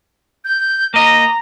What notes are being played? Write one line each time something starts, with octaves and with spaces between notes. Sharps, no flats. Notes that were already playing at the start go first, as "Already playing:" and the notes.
G6
A#3 D#5 A#5